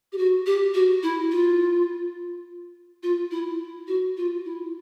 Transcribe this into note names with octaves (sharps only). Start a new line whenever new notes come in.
G4
F#4
G4
F#4
E4
F4
F4
E4
F#4
F4
E4